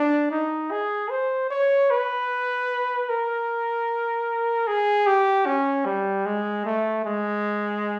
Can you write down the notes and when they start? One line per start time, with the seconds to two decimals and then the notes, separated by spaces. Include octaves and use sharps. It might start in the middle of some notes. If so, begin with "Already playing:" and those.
Already playing: D4
0.31 D#4
0.71 G#4
1.10 C5
1.50 C#5
1.90 B4
3.09 A#4
4.67 G#4
5.07 G4
5.46 C#4
5.85 G3
6.26 G#3
6.65 A3
7.05 G#3